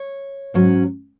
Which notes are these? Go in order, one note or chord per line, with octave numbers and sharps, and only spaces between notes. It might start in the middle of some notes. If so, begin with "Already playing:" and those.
Already playing: C#5
G#2 F#3 C#4